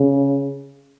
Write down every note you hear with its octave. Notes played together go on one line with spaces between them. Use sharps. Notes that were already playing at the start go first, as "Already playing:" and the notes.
Already playing: C#3